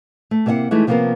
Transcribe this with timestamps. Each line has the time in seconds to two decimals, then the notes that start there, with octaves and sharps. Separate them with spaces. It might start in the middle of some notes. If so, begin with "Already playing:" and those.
0.31 A3
0.46 C3 A#3 E4 E5 F#5
0.71 E3 G#3 A3 D#4
0.87 C3 F3 A#3 B3 F4 A#4